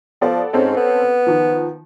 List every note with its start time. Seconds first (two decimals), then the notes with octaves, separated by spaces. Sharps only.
0.21 F3 B3 A4 D5
0.53 G#2 C4 C#4 A4
0.77 B3
1.27 D#3 F3